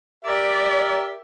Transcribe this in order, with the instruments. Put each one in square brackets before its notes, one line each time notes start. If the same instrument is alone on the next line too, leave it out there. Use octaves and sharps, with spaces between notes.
[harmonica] G4 A#4 E5 [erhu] D5